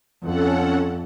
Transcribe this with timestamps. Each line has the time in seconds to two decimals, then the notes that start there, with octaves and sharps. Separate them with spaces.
0.23 F2 C#4 A4 F#5